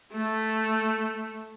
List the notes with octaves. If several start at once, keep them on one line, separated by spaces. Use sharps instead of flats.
A3